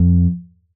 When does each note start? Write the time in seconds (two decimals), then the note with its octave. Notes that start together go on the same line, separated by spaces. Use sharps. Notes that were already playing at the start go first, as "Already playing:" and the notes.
Already playing: F2